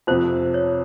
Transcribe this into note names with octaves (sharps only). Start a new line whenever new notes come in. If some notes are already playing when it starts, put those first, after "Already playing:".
F2 C3 F3 C5
C#5